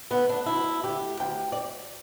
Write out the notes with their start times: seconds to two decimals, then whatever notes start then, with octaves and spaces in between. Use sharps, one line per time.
0.10 D3 A3 B3
0.29 D4
0.46 D2 E4
0.84 D3 A3 G4
1.20 D2 G5
1.52 D5